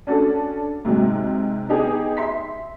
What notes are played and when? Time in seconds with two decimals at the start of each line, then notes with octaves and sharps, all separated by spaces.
0.07 C#4 D4 F#4 A4
0.85 G#2 C3 F#3 G#3
1.68 B3 D#4 G4 G#4
2.17 E5 C6 B6